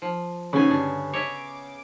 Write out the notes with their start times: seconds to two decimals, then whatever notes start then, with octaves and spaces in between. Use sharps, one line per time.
0.02 F3
0.53 C#3 F#3 B3 C#4 D#4 G#5
0.70 G2 D3 D4
1.13 C#5 D#5 E5 D6